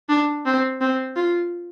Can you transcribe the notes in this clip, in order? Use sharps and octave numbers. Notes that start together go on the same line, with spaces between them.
D4
C4
C4
F4